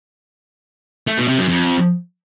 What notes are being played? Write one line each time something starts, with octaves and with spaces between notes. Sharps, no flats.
A3
B2
C3
F#2
F2